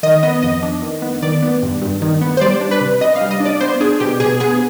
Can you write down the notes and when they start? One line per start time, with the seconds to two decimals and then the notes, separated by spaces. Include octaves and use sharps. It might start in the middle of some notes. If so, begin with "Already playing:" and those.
0.03 D#3 D#5
0.23 B3 D#5
0.42 F2 D#5
0.62 D4
0.82 D#3
1.02 B3
1.22 D#3 D5
1.42 B3
1.62 G2
1.82 G2
2.02 D#3
2.21 B3
2.37 C5
2.41 G3 D5
2.61 D4
2.71 B4
2.81 C3
3.01 C3 D#5
3.16 F5
3.21 G3
3.31 D#5
3.40 D4
3.45 D5
3.61 B3 C5
3.80 D4 G#4
4.00 B2 G4
4.20 B2 G#4
4.40 B3 G#4